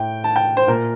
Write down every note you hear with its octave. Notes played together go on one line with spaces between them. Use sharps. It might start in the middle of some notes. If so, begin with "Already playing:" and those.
Already playing: A2 G5
A5
G5
C5
A#2 A#4